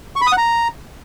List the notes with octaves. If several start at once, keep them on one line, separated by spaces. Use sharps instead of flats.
C#6
B5
D#6
F#5
A#5